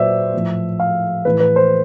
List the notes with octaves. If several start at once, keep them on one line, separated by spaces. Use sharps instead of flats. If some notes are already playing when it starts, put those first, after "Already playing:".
Already playing: A#2 F#3 B4 C5 D5 E5
A2 F3
F5
A2 E3 B4
B4
C5